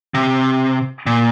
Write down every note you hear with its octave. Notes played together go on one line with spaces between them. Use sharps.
C3
A#2